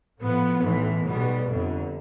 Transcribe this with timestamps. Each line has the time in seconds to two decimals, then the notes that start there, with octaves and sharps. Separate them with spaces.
0.20 A2 F3 B3
0.62 B1 A2 E3
1.04 B1 B2 G3 B3
1.45 G1 F2 D3